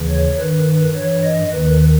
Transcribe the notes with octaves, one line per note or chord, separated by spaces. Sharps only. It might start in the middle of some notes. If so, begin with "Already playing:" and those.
Already playing: D#2 C#3 E3
C#5
G2 D#3 B4
G2 E3 C#5
D#5
D#2 D#3 B4